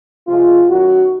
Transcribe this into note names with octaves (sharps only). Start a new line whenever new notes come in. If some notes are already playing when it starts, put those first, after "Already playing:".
C3 F3 G#3 F4
F#2 D#3 F#3 F#4